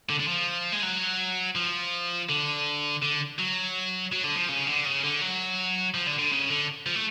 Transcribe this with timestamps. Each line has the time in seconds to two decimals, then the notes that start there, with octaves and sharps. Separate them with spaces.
0.09 D3
0.19 D3
0.28 F3
0.72 G#3
0.83 F#3
1.56 F3
2.29 D3
3.02 D3
3.38 F#3
4.12 F#3
4.23 D3
4.36 F3
4.49 C#3
4.67 D3
4.85 C#3
5.04 D3
5.21 F#3
5.95 F3
6.07 D3
6.19 D3
6.32 C#3
6.50 D3
6.86 F3
6.96 A3